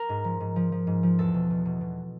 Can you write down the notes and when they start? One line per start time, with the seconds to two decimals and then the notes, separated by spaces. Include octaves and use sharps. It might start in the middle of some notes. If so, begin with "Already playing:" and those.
Already playing: A#4
0.09 G#2
0.24 F3
0.40 G#2
0.56 F3
0.72 F3
0.87 G#2
1.03 F3
1.19 E2 A4
1.34 B2
1.50 B2
1.65 B2
1.81 B2